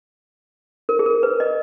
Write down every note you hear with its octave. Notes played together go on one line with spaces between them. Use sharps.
A#4
G#4
A#4
B4
D#5